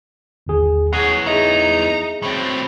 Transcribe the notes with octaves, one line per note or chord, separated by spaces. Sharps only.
G1 D#2 G#4
E2 F#3 G#4 C#5 F#5
D#4 G#4 E5 A#5
A2 F#3 C4